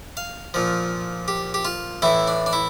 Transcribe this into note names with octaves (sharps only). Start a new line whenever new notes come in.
F5
A#2 F3
G4
G4
F4
A2 E3 E4
D4
D4
E4